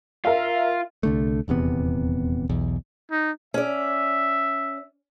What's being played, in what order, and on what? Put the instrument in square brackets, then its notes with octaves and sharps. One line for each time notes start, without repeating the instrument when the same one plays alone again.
[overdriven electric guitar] F4 [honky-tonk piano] A#4 E5 F5
[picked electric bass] C2 D3 A3
D#1 E2 C3 B3
B1 E2
[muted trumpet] D#4
[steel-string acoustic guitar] C#4 D5 [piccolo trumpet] E5